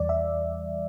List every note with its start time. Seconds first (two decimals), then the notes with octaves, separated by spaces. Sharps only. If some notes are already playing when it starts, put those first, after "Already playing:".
Already playing: E2 E3 G3 D5
0.09 E5